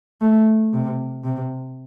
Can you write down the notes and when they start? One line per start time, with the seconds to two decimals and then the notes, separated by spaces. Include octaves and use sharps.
0.21 A3
0.73 C3
1.24 C3